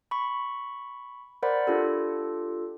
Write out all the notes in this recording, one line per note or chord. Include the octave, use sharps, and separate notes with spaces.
B5 C#6
A#4 C5 D5 F#5 B5
D4 F4 G4 A4